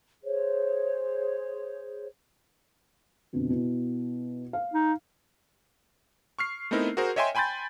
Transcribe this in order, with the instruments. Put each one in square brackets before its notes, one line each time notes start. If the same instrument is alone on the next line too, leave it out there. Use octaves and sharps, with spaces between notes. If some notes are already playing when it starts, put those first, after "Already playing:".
[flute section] G#4 C5 C#5
[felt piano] F2 B2 D3
B2 E4
F5
[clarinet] D#4
[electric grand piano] C#6 F6 C7
A3 B3 C4 D#4 E4 A#4
F#4 G#4 A#4 C5
C#5 D#5 E5 G5 G#5 C6
G5 G#5 B5 C6 G6 A6